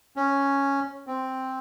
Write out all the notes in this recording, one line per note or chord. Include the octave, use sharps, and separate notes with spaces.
C#4
C4